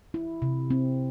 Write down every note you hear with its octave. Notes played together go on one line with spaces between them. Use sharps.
E4
C3
C4